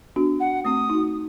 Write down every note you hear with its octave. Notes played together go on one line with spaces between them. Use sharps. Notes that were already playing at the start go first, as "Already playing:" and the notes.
B3 D4 F#4
F#5
A3 C4 D#6
D#4 F#4